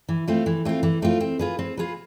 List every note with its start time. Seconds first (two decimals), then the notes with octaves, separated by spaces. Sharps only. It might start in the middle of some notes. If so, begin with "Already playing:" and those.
0.09 E3
0.28 A3 C4 F4
0.46 E3
0.65 A3 C4 F4
0.83 E3
1.02 A3 C4 F4
1.20 C4
1.39 F4 G#4 B4
1.59 C4
1.77 F4 G#4 B4